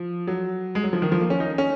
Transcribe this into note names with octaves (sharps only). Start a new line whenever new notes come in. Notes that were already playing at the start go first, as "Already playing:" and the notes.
Already playing: F3
F#3
G#3
F#3
F3
D#3
F3
A#3
C#4
D#4
C#4